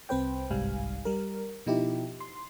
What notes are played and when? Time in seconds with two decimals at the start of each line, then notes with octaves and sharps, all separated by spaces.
0.09 C2 C4 B4 C5 G5
0.50 G1 C2 G#2 G3 F5 G#5
1.05 G3 A#4
1.66 B2 F3 D#4 E4 G4
2.20 C6